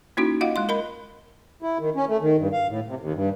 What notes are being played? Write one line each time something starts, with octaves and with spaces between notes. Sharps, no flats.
A#3 C#4 D#4 E4 F#4
F4 D#5 F5 F#5
G#3 F5 C6
A#4 D#5 B5
E4
D#3
C#4
A3
D#3
G2
F5
A2
C3
D#2
G2